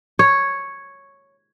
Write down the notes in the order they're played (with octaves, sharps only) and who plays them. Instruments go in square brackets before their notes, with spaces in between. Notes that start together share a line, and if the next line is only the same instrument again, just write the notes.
[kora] C#5